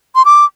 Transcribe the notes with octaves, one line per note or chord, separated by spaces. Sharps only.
C6
D6